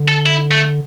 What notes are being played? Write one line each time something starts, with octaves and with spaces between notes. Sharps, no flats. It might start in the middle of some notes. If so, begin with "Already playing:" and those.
Already playing: D3
A4
E4
A3